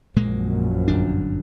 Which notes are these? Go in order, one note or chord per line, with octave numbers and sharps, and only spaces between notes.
A#1 F#2 A#2 G#3 A#3
G1 F2 D4